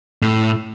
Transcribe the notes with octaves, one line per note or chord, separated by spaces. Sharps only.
A2